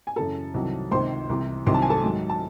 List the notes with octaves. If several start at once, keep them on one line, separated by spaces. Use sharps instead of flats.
G#5
F#2 C#3 E3 A4 A5
C2 C3 D#3 F#3
C#2 C3 D#3 C5 C6
C2 C3 E3
C2 C3 D#3 F#3 C6
A5
G#5
A4 A5
G#2 D#3 F#3
A5